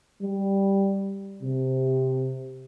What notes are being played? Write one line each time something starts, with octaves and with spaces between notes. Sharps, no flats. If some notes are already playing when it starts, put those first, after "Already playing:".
G3
C3